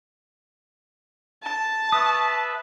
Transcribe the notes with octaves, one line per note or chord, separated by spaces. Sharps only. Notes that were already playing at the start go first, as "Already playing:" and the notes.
A5
B4 E5 C#6 D#6